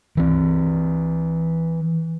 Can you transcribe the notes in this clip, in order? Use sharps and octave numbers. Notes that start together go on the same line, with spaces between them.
E3 C4